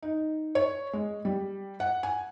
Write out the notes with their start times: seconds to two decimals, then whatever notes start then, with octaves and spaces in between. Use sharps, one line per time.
0.02 D#4
0.55 C#5
0.93 G#3
1.25 G3
1.80 F#5
2.03 G#5